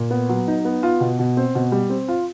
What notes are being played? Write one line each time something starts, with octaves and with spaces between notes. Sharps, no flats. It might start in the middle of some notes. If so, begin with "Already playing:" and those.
Already playing: A#2
B3
F#3
D#4
B3
F4
B2
B2
C4
B2
G3
C4
F4